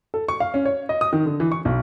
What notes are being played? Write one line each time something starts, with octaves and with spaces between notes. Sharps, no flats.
A4
C#6
F5
C#4
C#5
D#5
D#6
D#3
D3
E3
C#6
B1